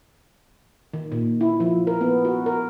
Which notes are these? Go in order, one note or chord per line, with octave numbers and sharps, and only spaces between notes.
D#3
A#2
E4
F3
A#4
B3
F#4
A#4